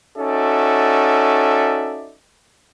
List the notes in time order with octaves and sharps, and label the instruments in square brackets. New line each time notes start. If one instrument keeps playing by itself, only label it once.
[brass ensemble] C#4 D#4 F#4 A4 D5 E5